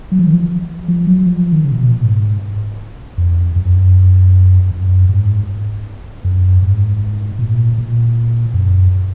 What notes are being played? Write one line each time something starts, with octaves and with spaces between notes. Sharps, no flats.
F#3
F3
D#3
F3
F3
F#3
F3
D#3
C#3
A#2
B2
A#2
G#2
F2
F#2
F#2
G#2
F#2
G#2
A#2
A#2
F#2